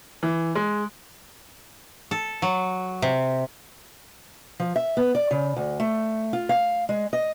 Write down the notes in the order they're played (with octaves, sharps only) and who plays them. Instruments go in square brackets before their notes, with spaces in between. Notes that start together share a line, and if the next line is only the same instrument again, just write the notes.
[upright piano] E3
G#3
[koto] A4
F#3
C3
[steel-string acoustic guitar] F3
E5
B3
D5
C#3
D2
A3
F4
F5
G#3
D#5